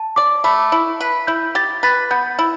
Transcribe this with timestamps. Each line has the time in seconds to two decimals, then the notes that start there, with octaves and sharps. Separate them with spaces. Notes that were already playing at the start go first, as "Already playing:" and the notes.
Already playing: A5
0.16 D5 D6
0.44 A3 B5
0.72 E4
1.00 B4
1.27 E4 G6
1.55 G4 A6
1.83 B4 A6
2.11 B3 G6
2.39 E4